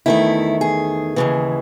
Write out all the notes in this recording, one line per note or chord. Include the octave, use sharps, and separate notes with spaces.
E2 D#3 A3 E4
G#4
D#2 C#3 E3